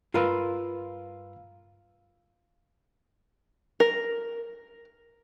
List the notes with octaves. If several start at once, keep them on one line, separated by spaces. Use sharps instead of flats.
G2 F4 A#4 B4 F5 E6
A#4